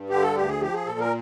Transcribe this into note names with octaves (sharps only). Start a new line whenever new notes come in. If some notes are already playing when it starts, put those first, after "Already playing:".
Already playing: G2
D3 G4
A4
D2 G4
G#4
F3 G4
G#4
A#2 A4
A#4